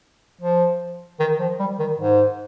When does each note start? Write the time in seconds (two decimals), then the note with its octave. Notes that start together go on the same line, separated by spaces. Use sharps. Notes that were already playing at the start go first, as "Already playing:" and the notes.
0.41 F3
1.20 D#3
1.40 F3
1.59 G3
1.79 D#3
1.98 G#2